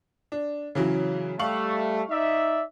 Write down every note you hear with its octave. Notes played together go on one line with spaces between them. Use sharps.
D4
C#3 E3 F#3
G3 A3 F5 C#6 F#7
D#4 D5 E5